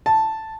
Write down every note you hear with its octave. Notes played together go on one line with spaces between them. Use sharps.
A5